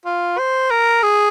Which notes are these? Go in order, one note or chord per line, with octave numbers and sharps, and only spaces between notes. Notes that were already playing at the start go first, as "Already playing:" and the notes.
F4
C5
A#4
G#4